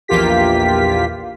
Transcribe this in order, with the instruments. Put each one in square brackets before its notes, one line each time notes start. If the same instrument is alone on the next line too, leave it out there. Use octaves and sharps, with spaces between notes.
[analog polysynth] A#1 E2 A#3 F4 G4 B6